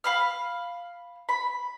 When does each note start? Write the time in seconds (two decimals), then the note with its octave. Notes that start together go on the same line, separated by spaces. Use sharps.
0.04 F5 B5 F6
1.29 B5